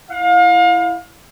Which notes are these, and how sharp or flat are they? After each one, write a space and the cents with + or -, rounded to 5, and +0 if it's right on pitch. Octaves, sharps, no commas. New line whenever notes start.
E4 +10 F5 +35